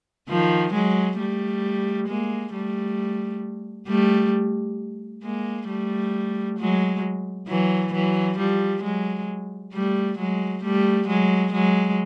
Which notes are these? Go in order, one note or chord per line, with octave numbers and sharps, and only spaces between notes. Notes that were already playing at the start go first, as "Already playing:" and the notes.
D#3 F3
F#3 G#3
G3 A3
G#3 A#3
G3 A3
G3 A3
G#3 A#3
G3 A3
F#3 G#3
E3 F#3
E3 F#3
F3 G3
F#3 G#3
G3 A3
F#3 G#3
G3 A3
F#3 G#3
F#3 G#3